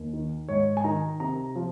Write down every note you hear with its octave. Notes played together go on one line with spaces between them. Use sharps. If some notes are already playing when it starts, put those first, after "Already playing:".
Already playing: D#2
D#3
G#2 C#5
G#5
D#3 A#5
C3 A#5
F3